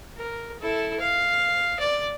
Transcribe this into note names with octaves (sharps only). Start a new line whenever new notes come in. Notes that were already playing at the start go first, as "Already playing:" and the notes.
A#4
E4 A4
F5
D5